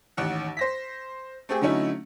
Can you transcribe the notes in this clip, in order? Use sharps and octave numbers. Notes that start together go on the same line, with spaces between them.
A1 D#2 F#5
C5 A#6 B6
A3 C4 G4 G#4
D3 F#3 A3 C#4 D#4 E4